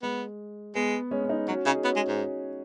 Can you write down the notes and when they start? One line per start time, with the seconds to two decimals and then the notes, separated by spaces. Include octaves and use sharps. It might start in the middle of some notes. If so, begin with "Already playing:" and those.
0.03 G#3 B3
0.75 G#3 B3
1.11 G#3 C#4
1.25 C#4
1.29 B3 D#4
1.48 F#3 C#4 F#4
1.66 C#3 D#4 G#4
1.84 B3 C#4 F#4
1.96 G#3
2.08 G#2